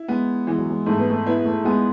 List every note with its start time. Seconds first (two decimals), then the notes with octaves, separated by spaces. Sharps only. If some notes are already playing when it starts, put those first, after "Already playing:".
Already playing: E4
0.08 G#3 B3
0.47 E3 G#3
0.58 F#3
0.69 G#3
0.86 G#2 A3
0.99 B3
1.10 A3
1.26 B3 E4
1.45 A3
1.65 G#3 B3